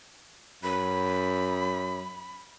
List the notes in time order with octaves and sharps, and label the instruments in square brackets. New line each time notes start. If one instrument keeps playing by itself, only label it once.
[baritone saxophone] F#2 [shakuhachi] B5